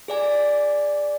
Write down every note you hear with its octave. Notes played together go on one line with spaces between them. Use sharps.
G#4 D5 G#5